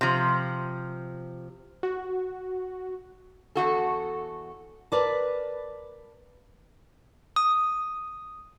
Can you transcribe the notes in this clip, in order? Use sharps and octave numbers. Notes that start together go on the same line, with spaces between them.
C3 F3
F#4
E2 F#4 A4
A#4 B4 D5 A5
D#6